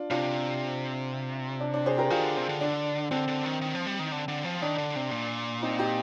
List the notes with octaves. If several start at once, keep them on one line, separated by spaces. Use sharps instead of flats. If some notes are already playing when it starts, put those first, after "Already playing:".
Already playing: D4 F4
C3 D4 F4
D4
D4
G#4 C5
G4 A#4
D#3 F4 G#4
D3
C3
D3
D4
D3 C4
D3
D#3
D#3
F3
G3
D#3
D3
D3
F3
D#3 D4
D3
C3
A#2
C4 D#4
D#4 G4